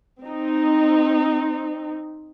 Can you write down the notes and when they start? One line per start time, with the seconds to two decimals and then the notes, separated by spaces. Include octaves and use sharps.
0.23 C4 D#4